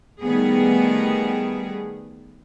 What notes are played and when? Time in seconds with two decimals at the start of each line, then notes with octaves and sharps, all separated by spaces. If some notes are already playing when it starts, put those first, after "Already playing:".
0.22 D#3 G3 A3 B3 G#4